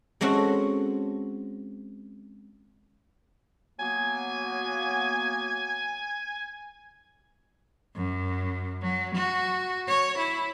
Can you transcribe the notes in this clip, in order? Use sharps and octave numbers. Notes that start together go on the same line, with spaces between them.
G#3 C4 C#4 F#4 A4
F#3 A#3 B3 G#5
F#2
F#3
F#4
C#5
E4